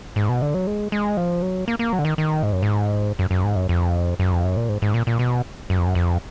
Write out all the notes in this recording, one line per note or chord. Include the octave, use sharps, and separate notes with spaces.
G#2
B2
D3
F#3
G#3
G#3
F3
F#3
A#3
A#3
F#3
D3
D#3
D#3
G#2
F#2
G#2
F#2
F#2
G#2
F#2
F2
F#2
F2
F#2
A#2
G#2
G#2
A#2
A#2
B2
F#2
F2
F#2
F2